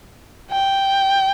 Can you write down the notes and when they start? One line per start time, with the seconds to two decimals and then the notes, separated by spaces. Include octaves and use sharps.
0.51 G5